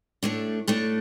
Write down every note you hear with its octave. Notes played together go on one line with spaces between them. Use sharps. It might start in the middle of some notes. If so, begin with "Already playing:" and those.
A2 A3 D4
A2 A3 D4